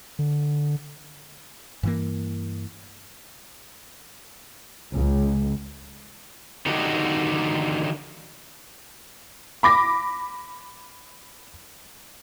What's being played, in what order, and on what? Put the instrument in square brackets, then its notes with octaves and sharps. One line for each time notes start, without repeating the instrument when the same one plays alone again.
[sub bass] D3
[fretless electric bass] G2 E3 A#3
[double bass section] C#2
[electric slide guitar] D3 D#3 D4 D#4 F#4 G4
[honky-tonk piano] B5 D6 A#6